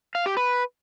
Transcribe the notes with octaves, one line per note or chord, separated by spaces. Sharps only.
F5
G4
B4